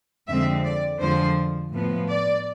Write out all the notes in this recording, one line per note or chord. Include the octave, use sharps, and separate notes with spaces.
F2 D3 G#3 C4 E5
D5
F2 D3 F3 G#3 C5
A2 F3 B3
D5